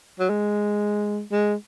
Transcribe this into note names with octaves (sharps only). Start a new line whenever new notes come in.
F#3
G#3
G#3